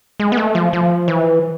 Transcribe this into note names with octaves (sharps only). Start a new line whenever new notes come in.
G#3
B3
A3
F3
F3
E3